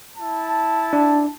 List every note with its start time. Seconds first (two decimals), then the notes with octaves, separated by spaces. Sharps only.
0.16 E4 A5
0.93 D4